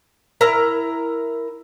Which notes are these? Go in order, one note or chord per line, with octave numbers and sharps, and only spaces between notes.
E4 A#4 A#5